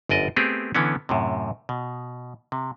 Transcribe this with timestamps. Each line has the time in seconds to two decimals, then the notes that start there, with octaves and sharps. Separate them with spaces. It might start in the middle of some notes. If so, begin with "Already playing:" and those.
0.09 G1 F#2 D5 D#5
0.36 A3 B3 C4 G4 G#4
0.75 D3 E3 B3 C#4
1.09 F#2 A2 C3
1.69 B2
2.52 C3